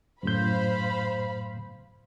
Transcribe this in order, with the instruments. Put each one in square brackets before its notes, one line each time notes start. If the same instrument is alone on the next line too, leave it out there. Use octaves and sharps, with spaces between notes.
[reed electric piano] F#2 A2 G6 [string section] C5 F5 B5